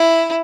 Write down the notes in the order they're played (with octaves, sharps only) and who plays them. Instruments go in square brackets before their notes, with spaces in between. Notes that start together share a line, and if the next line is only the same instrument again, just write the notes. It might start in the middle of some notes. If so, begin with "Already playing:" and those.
Already playing: [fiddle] E4